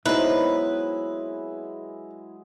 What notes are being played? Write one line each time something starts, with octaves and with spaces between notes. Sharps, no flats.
F#3 G#3 B3 C4 D#4 E4 B4